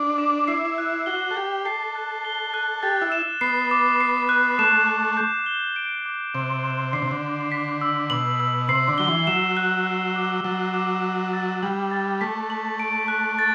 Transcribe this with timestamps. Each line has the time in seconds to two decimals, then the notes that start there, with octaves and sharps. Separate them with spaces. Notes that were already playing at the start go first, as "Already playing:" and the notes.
Already playing: D4
0.18 D6
0.48 E4 C7
0.78 F#6
1.06 F#4 G7
1.31 A4
1.36 G4 F#6
1.65 A4 C7
1.95 F#6
2.25 G7
2.54 F#6
2.83 G4 A6
3.02 E4
3.12 E7
3.41 B3 C7
3.71 D6
4.01 C7
4.29 F#6
4.59 A3 E7
4.87 F#6
5.17 G6
5.46 G7
5.76 D7
6.06 D6
6.34 C3 F#6
6.64 E7
6.93 D3 C7
7.02 C3
7.11 D3
7.22 D6
7.52 B6
7.81 E6
8.10 B2 F#7
8.40 E6
8.69 C3 C7
8.88 D3
8.98 F#3 G7
9.08 E3
9.27 F#3 E7
9.57 F#6
9.87 F#6
10.16 D6
10.44 F#3 A6
10.74 D6
11.03 C7
11.33 A6
11.62 G3 F#7
11.91 A6
12.21 A3 B6
12.50 F#7
12.79 D7
13.08 F#6
13.39 A6